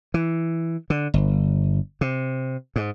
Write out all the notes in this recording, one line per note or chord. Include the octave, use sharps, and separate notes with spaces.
E3
D3
G1
C3
G#2